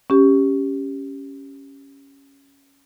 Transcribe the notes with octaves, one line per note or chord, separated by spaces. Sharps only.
C#4 G4